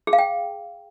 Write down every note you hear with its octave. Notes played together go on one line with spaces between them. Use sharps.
G#4
F5
G5